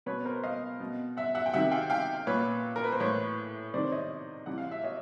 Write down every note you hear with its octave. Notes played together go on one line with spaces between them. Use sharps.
B2 B4 C#5
A#4 C5
D#5 F5
B2
E5 F#5
E5 F#5
G5
C3 D#3 E5 F#5
F5 G5
F5 G5
A#2 B4 C#5
A#4
B4
C5
A2 E3 B4 C#5
C3 D#3 C5 D5
C#5 D#5
C3 E3 F#5
F5
E5
C#5 D#5